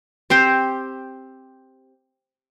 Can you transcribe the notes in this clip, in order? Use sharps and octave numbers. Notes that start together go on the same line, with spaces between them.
C4 G4 C5